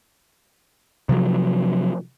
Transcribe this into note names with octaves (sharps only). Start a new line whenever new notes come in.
C3 F3 F#3